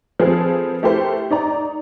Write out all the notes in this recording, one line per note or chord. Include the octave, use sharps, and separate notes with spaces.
F3 C4 G#4 A4 B4
A3 E4 G4 A#4 C5
D#4 D5 A#5